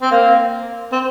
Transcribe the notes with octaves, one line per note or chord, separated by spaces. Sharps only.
C4
A#3
C4